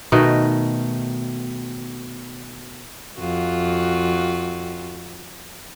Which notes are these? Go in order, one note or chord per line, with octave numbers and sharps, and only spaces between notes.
B2 D#3 A3 D#5
F2 F4 F#4